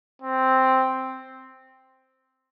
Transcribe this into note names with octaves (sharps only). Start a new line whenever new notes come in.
C4